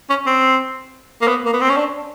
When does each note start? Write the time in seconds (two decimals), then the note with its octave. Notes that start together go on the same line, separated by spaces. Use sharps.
0.10 C#4
0.26 C4
1.22 A#3
1.27 B3
1.45 A#3
1.53 B3
1.61 C4
1.70 C#4
1.77 D4